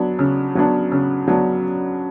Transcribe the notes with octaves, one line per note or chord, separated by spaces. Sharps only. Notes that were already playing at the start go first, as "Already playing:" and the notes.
Already playing: F#3 B3 D4
C#3
F#3 B3 D4
C#3
F#3 B3 D4